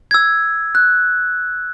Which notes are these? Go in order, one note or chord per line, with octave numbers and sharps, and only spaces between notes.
E6 G#6
F#6